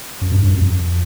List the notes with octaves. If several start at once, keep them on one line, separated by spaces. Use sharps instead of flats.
F#2
G2
F#2
F2